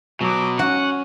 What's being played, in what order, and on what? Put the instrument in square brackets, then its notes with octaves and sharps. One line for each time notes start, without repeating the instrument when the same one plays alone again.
[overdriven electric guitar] B2 [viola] F#3 D6
[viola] C#4 [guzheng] F#4 [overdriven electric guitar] F#5